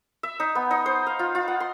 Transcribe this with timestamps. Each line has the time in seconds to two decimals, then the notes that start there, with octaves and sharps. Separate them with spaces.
0.23 E5
0.40 D#4
0.55 B3
0.71 D#4
0.86 C5
1.07 F5
1.19 F4
1.35 F4
1.48 F#5
1.60 C6